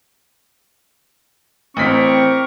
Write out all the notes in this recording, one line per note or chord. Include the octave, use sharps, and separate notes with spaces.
A1 C4 G4 A#4 C#6 B6